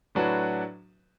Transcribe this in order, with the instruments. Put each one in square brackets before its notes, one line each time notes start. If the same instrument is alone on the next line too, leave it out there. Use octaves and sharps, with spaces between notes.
[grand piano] A2 F#3 D4 F#4 B4